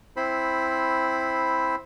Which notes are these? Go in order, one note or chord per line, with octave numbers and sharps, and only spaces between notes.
C4 E4 C5 B5